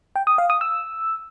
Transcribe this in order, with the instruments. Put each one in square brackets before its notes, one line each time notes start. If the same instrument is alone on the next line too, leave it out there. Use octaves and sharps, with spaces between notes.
[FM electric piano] G5
D#6
F5
D#6
E6